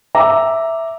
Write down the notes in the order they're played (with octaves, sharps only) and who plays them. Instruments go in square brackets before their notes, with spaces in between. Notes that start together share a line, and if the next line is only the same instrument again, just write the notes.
[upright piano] E5 A#5 D6